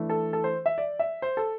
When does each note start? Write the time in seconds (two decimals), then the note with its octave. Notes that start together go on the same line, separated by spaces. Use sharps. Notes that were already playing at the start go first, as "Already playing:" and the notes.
Already playing: E3 A3 D4
0.10 A4
0.33 A4
0.44 C5
0.66 E5
0.78 D5
0.99 E5
1.22 C5
1.37 A4